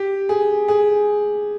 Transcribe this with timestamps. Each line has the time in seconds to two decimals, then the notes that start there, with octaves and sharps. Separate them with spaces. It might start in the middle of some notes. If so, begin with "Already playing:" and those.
Already playing: G4
0.29 G#4
0.68 G#4